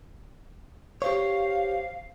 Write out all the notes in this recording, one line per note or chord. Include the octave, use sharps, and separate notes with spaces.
G4 C5 C#5 F5